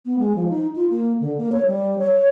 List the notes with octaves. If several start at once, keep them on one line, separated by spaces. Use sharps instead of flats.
B3
G#3
F3
D#4
F4
A#3
D3
A#3
C#5
G3
C#5